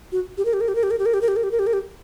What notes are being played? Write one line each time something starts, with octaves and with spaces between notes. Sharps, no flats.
F#4
G4
A#4
G4
A#4
G4
A#4
G4
A#4
G4
A#4
G4
A#4
G4
A#4
G4
A#4
G4
A#4
G4